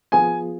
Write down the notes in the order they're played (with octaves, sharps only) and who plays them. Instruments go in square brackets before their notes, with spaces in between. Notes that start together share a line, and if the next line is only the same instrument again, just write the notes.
[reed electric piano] F3 B3 F4 G#4 [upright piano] G#5